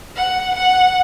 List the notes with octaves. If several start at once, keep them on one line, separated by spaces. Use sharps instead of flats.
F#5
F#5